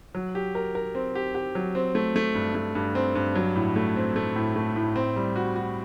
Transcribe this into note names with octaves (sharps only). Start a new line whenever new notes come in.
F#3
G4
A#4
A#4
C4
G4
G4
F#3
C4
A3
A3
G2
A3
G2
C4
G2
F#3
A2
A3
C4
A3
A2
A3
A2
C4
G3
F#4
F#4